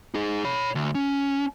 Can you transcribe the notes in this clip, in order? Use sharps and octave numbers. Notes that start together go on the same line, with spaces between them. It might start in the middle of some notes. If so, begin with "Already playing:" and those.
D#4 G#4
C#5 B5
D2
C#4